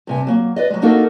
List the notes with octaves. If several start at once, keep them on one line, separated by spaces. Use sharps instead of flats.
G2 C3 G#5
F#3 A#3
B4 D5 D#5
F#3 G#3
A#3 D4 D#4 F#4 A4 A#4